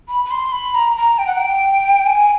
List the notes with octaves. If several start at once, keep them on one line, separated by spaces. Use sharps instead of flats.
B5
B5
C6
B5
A#5
A#5
G5
F#5
G5
G#5